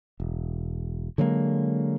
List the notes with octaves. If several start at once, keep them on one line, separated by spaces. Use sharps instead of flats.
E1
D3 F#3 G#3 A#3